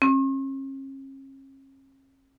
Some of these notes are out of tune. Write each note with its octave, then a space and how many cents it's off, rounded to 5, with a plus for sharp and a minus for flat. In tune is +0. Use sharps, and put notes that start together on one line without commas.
C#4 -45